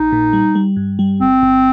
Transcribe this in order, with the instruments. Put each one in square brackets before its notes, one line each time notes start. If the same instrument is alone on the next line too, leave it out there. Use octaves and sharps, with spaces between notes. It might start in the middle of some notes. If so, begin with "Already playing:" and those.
Already playing: [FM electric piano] A#1 [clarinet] D#4
[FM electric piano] A#2
G3
G3
G2
G3
[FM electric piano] G1 [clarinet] C4
[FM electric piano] G1